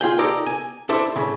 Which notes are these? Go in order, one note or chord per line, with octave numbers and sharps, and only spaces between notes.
F4 G#4 G5
D#4 G4 A4 A#4 D5
G#5
D4 E4 A4 C5 E5
A2 C#3